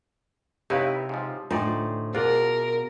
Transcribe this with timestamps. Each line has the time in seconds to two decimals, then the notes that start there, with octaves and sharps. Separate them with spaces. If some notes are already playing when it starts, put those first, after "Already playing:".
0.70 C3 D#4 E4 G4 B4 C#5 F5
1.09 G#2 F3
1.51 D2 A2 D4 D#4 F4 C5 D5
2.15 B2 F4 G#4 A#4 C5 D5